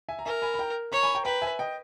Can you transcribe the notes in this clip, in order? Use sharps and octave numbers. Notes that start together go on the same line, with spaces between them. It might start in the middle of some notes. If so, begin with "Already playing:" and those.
E5 G#5
A#5
A#4 E5 G#5
G#5 B5
B5
G5 A#5
C#5 A#5 C#6
G#5 B5
G5 A#5
B4 G5 A#5
E5 G#5
D#5 G5